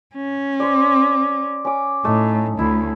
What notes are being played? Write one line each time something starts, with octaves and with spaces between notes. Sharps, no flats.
C#4
C5 D5
C#4 D6
A2 A3 D#4
D2 E4